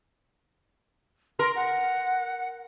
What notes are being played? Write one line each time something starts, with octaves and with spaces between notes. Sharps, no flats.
A#4 C6
F#5